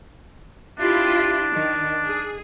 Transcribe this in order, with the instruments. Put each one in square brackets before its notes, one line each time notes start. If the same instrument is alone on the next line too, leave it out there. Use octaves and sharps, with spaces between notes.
[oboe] D4 [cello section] E4 F4 G4
[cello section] D#3
G#4